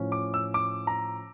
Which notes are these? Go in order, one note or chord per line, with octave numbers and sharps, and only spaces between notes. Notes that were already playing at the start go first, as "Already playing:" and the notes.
Already playing: A2 F3 C#4
D6
E6
D6
A#5